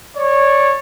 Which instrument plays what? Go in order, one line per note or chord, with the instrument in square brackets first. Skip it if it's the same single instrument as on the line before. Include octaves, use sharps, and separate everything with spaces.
[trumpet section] C#5 D5